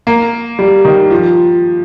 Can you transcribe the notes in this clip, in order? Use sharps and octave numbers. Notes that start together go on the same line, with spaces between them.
A#3
G3
D#3
F3